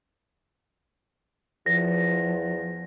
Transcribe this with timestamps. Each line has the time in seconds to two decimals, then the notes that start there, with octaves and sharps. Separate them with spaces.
1.66 E2 F3 A#6